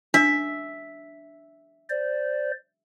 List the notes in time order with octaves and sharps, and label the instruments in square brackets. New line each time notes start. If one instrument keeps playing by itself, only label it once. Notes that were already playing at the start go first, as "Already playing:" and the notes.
[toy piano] D4 [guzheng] E5
[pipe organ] C5 D5